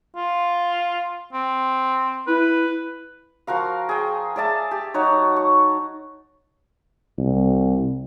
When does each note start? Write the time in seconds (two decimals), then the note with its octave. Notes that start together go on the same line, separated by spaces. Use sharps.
0.16 F4
1.33 C4
2.27 E4 B4
3.47 F3 F#4 A#4 F5
3.89 G#4 G5
4.36 G#4 D5 E5 A5
4.71 G4
4.94 F#3 D#4 F#4 C#5
5.36 C#6
7.18 C2